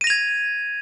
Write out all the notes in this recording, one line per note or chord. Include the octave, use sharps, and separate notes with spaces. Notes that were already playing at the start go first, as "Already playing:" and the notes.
G#6 A#6 D#7 F7